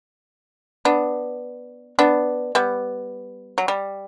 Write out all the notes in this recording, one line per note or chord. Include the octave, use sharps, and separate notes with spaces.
B3 D4
B3 D4
G3 B3
F#3
G3